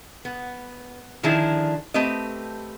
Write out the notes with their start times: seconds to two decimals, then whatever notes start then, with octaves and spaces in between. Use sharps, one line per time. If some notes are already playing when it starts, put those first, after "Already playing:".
0.25 B3
1.23 D3 D#3 F3 D4 E4 G#4
1.94 A3 C4 G4 B4 D#5